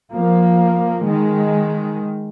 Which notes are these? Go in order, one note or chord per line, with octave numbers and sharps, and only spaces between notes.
F3 A#3
D#3 G#3